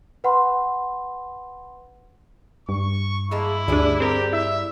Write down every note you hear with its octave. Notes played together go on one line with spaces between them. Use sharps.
B4 F#5 B5 C6
G2 C#6
G#3 A#3 E4 A5
D2 G3 D4 G#4 B4
C4 G4 A#4
E4 E5